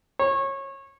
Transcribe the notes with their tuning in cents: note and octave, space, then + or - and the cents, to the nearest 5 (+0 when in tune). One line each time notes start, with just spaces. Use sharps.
C#5 -25